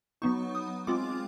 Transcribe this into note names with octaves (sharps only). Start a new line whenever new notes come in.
F#3 B3 D#4 C#6
D#6
G#3 C4 F4 D6